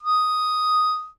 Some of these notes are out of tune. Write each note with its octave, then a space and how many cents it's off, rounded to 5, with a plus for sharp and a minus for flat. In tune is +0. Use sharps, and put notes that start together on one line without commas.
D#6 +0